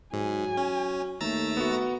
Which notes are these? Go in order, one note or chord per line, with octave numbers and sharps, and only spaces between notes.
G#2 F#3 G#5
C#4
D#2 A3 A#5 E6 A6
B3 F#4